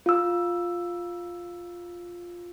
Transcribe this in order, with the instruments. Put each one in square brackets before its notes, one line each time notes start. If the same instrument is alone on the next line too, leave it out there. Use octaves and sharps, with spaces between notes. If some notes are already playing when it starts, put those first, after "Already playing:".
[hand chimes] F4 E6